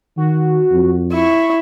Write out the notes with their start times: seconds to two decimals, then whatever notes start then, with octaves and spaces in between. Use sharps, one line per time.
0.17 D#3 F#4
0.72 F2
1.12 E4 C#6